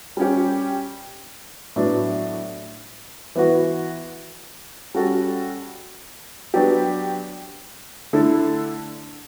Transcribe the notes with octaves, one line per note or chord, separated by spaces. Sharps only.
G3 C#4 G4
A2 F#3 B3 D4
E3 B3 F#4
G3 C#4 F#4 A4
F#3 B3 D4 G4
D3 A3 E4 A4